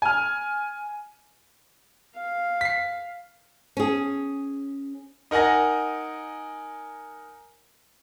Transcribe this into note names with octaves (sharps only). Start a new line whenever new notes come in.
G#5 F6
F5
B6 C7
C#4 G#4
D#4 A#4 F#5 G#5 A#6